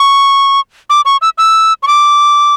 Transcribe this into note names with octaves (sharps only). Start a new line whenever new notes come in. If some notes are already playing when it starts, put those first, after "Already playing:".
Already playing: C#6
D6
C#6
E6
E6
C#6
D6